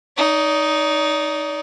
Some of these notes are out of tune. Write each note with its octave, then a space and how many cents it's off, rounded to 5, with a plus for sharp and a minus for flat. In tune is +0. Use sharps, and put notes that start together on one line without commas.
D#4 +0 D5 -40